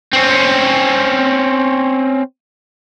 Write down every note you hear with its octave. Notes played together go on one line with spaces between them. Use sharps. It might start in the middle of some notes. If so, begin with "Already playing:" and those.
C4 C#4